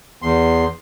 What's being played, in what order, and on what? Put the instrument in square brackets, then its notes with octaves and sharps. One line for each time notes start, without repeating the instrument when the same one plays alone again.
[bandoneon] E2 C6